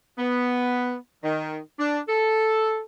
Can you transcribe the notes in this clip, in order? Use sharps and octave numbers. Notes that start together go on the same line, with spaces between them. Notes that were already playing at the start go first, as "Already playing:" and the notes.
B3
D#3
D4
A4